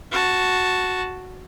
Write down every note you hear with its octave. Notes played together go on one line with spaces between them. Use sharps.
F#4 A5